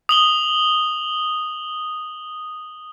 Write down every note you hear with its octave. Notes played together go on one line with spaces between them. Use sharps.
D#6 F#7 G7